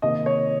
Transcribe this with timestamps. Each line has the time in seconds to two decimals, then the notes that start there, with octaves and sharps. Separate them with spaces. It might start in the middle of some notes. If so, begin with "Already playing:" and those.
0.02 C3 D#3 A#3 D#4 D#5
0.26 C#5